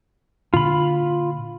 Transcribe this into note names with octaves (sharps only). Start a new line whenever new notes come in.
A#2 D3 F4 B5